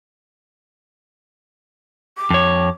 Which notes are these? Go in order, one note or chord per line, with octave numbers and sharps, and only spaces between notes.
D6
F2 C#5